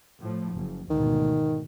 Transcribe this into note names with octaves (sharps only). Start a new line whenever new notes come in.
A2 F3
F#1
D2 G#2 B2 D#3